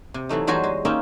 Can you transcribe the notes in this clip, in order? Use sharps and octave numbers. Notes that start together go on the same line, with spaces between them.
C3
E3 F#3 A3 D#4
E2 F#3 G3 F#4 C5 G#5
G#3
A#3 C#4 D#4 F4 E5 G5